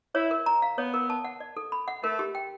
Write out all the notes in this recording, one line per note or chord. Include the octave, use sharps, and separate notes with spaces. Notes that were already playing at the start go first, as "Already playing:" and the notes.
E4 C#5
A#4
A#5
F5
B3 C#5
A#4
A5
F#5
D5
A4
B5
F#5
A3 A#4
G4
G5